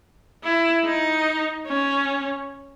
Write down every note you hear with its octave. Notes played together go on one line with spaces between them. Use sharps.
E4
D#4
C#4